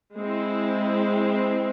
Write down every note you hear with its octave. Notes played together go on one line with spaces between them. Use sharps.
G#3 C4 E4